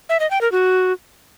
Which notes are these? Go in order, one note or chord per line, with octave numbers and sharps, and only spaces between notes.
E5
D#5
G5
A#4
F#4